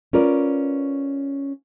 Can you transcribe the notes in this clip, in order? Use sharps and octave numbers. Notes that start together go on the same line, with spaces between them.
C#4 F4 A#4 B4 D5